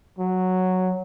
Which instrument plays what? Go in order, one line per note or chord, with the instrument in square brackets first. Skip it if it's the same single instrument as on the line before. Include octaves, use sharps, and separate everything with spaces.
[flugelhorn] F#3